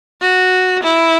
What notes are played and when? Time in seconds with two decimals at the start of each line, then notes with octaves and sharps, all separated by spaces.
0.22 F#4
0.84 E4